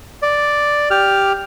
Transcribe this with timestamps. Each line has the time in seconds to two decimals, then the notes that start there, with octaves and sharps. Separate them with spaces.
0.22 D5
0.90 G4 F6